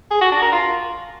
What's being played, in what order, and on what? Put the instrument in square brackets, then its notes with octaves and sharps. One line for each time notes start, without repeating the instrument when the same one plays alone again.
[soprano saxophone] G#4
F#4
D4
A#4
F4